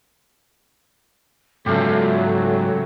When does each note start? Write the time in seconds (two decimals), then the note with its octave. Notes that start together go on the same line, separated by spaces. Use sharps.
1.66 G#2 C#3 F#3 A3 F4 G4 A4